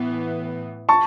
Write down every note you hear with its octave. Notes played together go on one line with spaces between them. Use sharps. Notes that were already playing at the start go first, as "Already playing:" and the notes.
Already playing: A2 E3 B3
A5 C#6